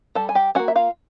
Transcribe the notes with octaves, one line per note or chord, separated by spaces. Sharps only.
G3 A4 A5
G#5
G4 G5
A#3 C#4 F#4 F#5
E5
F4 F5